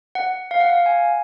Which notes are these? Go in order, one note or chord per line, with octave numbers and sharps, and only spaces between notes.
F#5
F5
F#5
F5
G#5